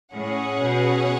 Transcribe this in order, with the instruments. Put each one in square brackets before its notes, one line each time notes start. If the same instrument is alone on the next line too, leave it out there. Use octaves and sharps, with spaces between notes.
[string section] A2 [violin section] C#4 G#4 C#5 F#5
[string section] B2